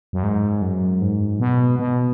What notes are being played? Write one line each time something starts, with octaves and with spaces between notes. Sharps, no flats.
F#2
G#2
F#2
G#2
B2
B2